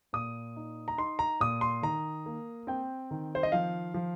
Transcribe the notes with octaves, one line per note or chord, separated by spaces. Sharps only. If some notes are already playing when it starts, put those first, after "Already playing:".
A#2 D#6
D#4
A#5
D#4 C6
A#5
A#2 D#6
C6
D#3 A#5
A#3
C4 G5
D#3
C5
D#5
F3 F5
F3